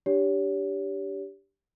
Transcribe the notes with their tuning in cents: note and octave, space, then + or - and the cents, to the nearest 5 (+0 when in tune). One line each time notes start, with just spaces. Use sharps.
D4 +0 G4 +0 C#5 +35